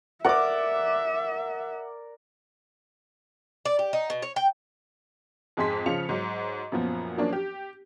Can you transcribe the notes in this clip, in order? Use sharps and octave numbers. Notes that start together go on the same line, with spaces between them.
A#4 D5 E5 F#5 D6
D5
G4
D#4
B2
C#5
G5
F2 G#2 G#3 G#4 C6 B6
C#3 F3 F4 C#7 F7
G#2 F#3
F#2 A#2 F3 B3
F3 F#3 A#3 C#4 D4
G4